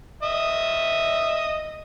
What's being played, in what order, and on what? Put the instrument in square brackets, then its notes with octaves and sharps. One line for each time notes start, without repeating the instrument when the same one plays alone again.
[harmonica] D#5 E5